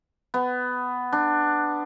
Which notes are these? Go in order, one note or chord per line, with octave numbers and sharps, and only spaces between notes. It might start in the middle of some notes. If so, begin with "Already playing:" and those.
B3
D4